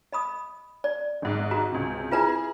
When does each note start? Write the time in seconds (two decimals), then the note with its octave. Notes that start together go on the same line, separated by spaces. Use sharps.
0.13 D#5 B5 D#6
0.84 D5
1.22 G#1 G#2
1.51 F#4 A#5
1.72 C#2 C3
2.12 E4 F4 G#4 B4 A#5